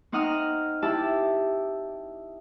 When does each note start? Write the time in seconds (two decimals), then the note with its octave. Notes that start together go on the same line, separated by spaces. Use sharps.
0.12 C4 D#4 F#5 A#5 D#6 F6
0.82 E4 G4 A5